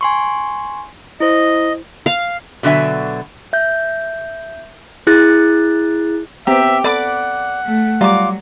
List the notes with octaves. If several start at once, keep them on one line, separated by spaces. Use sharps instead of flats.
G#5 C6 C#6
E4 C5 D#5
F5
B2 D3 F#3 E5 G#5
E5 G6
E4 G#4 F#6 A6
B3 C4 G4 E5 A#5
A4 D5 F#5 B5 D6
A3
F#3 G3 F4 D5 A#5 D6